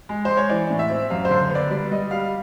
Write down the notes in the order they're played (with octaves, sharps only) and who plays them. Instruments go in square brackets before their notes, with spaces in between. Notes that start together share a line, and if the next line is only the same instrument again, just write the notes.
[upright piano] G#3
G#3 C5
C#5
E3 D5
A2
E5
C4
F#2 F5
C5
D3
B3
D5
G3 D5
G3 D#5
G3 F5